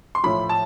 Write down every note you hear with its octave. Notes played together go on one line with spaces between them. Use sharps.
C6
A2 F3 B5
A5